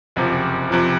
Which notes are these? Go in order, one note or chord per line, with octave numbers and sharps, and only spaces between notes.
F#1 F2 C3 F3
F2 C3 F3